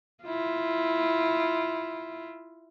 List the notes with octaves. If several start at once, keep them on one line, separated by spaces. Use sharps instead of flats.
E4 F4